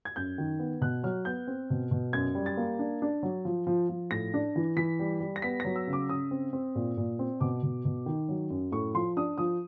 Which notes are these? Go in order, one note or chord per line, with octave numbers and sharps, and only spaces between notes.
G#6
F#2 G6
D#3
B3
B2 F#6
F#3 F6
B3 G6
C4
B2
B2
F#2 G#6
G3
A6
A#3
D4
D4
F#3
F3
F3
F3
A2 A#6
D4
E3
E3 B6
G3
G3
A#6
B3 B6
F#3 A#6
E6
C#3
D6
C#3 D#6
C4
C4
A#2
A#2
C4
B2 D6
B2
B2
D#3
F#3
F#2
A2 C#6
F3 C6
D4 D#6
F3 D#6